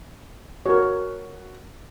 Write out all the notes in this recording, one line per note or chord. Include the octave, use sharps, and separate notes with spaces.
F#4 A#4 C#5